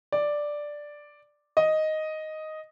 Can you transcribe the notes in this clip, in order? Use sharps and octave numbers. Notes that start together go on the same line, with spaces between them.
D5
D#5